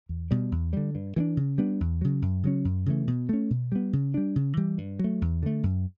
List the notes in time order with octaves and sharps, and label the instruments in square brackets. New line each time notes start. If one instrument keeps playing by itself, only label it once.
[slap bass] E2
B2 G3
E2
D3 G3
G2
E3 A3 D4
C#3
G3 B3 D4
E2
C#3 F#3
F#2
C#3 F#3 C#4
F#2
C#3 E3 A3
B2
A3 C#4
B2
G3 B3
C#3
G3 D4
C#3
E3 G3
G2
F#3 A3
E2
D3 A3
F#2